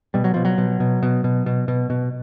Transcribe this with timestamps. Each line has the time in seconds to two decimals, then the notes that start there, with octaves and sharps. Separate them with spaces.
0.14 B2 G3
0.24 F#3
0.34 B2 F3
0.45 F#3
0.58 B2
0.80 B2
1.03 B2
1.24 B2
1.46 B2
1.68 B2
1.90 B2